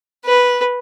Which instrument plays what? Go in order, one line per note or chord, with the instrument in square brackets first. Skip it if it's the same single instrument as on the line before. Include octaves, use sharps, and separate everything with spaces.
[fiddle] B4